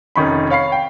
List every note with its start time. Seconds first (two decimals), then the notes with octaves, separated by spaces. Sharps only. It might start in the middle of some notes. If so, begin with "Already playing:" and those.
0.16 F1 D#3 C#4 B5
0.50 C#5 F5 B5 C7
0.72 G5